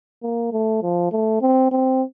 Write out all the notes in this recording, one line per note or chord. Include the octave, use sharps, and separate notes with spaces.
A#3
A3
F3
A3
C4
C4